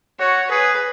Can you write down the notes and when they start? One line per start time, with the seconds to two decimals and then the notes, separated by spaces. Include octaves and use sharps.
0.19 F#4 C#5
0.51 G#4 B4